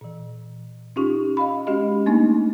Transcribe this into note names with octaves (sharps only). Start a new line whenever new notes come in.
A#2 E3
C#4 D#4 F4 G4 C#6
D#5 F5 B5
G#3 C#4 F#4 G4 D#5
A3 A#3 D4 D#4 G#5